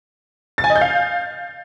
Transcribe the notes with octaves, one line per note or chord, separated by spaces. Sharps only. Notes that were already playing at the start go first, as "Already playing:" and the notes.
A6
G#5
D#5
G6
F5